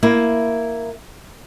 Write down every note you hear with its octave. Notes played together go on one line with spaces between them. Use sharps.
A#3 E4